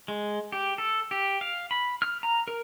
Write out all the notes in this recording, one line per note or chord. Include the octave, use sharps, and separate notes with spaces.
G#3
G4
A4
G4
F5
B5
F6
A#5
A#4